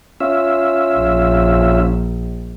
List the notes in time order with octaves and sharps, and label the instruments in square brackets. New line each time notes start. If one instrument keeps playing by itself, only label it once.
[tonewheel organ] C#4 F4 E5
[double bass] A#1